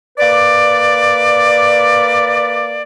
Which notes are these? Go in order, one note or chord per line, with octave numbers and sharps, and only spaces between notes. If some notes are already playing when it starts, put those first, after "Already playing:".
A#3 B4 D5